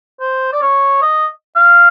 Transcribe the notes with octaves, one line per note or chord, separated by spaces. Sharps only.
C5
D5
C#5
D#5
F5